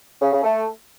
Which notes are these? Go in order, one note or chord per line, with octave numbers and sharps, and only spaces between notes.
C#3
C#3
A3